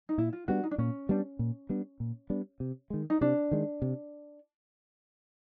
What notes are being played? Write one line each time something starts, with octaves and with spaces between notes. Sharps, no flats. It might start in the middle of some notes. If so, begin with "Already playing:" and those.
D#4
A#2 E4
F4
G3 B3 D4 F#4
D#4
D4
A#2 C#4
G3 B3 D4
A#2
G3 B3 D4
A#2
G3 B3 D4
C3
D#3 G#3
D#4
C3 D4
D#3 G#3
C3